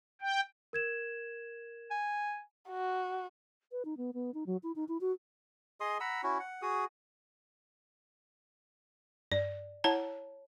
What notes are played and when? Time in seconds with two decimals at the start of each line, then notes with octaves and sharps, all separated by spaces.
0.22 G5
0.73 A#4 G#6 E7
1.91 G#5
2.69 F#4
3.72 B4
3.85 D#4
3.97 B3
4.14 B3
4.34 D#4
4.46 F#3
4.63 E4
4.76 D#4
4.88 E4
5.01 F#4
5.80 G#4 D#5 C6 D#6
6.00 F#5 A#5 B5 E6
6.23 C#4 E4 F#4
6.40 F#5
6.62 F#4 G#4 D#6
9.32 G2 D5
9.84 E4 C#5 F#5 A5 A#5